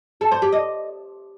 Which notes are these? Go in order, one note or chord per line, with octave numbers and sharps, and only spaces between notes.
A4
C5
G4
D#5